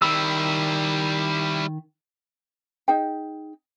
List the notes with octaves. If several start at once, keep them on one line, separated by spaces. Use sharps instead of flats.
D#3 G3 E4 B5 E6
D#4 G#4 G5